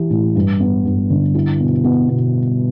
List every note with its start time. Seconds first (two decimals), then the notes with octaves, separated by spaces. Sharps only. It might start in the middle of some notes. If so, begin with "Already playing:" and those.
Already playing: E3 G4
0.10 A2
0.35 G2
0.60 B3
0.85 G2
1.10 D3
1.35 E4
1.60 B2
1.84 B3
2.09 B2